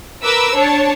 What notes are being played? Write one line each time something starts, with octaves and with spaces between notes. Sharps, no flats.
A#4 B4 D6 E6
D4 C#5 A5